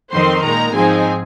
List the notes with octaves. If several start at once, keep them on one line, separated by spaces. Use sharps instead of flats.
F2 D#3 C4 D#4 C5 C6
A#2 G#3 D#4 A#4 A#5
G#2 F3 C4 D#4 G#4 G#5